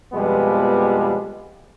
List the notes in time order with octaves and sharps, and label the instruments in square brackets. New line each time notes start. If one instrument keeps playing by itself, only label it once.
[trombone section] F2 B2 F3 G3 G#3 B3